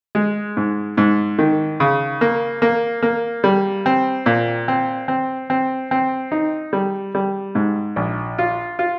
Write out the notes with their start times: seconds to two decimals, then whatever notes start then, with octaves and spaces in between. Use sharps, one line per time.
0.15 G#3
0.57 G#2
0.97 G#2
1.39 D#3
1.80 C#3
2.21 A#3
2.62 A#3
3.03 A#3
3.44 G3
3.86 C4
4.26 A#2
4.68 C4
5.08 C4
5.50 C4
5.91 C4
6.32 D#4
6.73 G3
7.15 G3
7.55 G#2
7.96 A#1
8.38 F4
8.79 F4